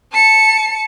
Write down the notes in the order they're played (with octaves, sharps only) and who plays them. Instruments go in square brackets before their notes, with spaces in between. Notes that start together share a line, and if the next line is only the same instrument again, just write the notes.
[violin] A5 C#7